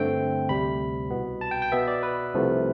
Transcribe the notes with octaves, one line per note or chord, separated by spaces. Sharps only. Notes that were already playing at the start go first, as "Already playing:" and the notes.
Already playing: G2 D3 A3 C4 G5
D2 C3 G3 B5
C2 B2 B3
A5
G5
G5
B2 B3 E5
D5
B4
C2 C3 F3 A3